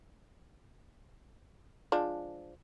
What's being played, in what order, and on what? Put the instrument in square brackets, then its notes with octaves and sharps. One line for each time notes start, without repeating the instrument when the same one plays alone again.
[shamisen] F3 G#3 D4